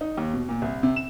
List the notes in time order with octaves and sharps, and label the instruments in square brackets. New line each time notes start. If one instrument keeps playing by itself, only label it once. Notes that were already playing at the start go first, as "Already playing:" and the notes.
[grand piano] D#4
D#2
B2
A#2
C2
C3
E7